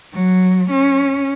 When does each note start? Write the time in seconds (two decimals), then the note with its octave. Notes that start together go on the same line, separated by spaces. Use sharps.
0.13 F#3
0.70 C#4